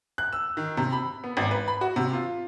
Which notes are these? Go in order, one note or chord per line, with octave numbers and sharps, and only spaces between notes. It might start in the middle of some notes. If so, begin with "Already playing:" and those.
F#6
E6
D#3
C3
B5
B3
G#1
B4
B5
F#4
C3
F4